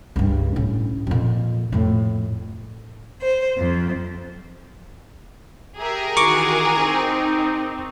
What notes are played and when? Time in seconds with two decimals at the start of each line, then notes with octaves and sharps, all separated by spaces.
0.16 C#2 G2
0.56 A2 C#4
1.07 F2 A#2
1.72 F2 A2
3.21 C5
3.58 F2
5.78 G4 G#4 A#4 E5
6.17 D#3 E3 F#4 C#6 D6
6.76 C4 D#4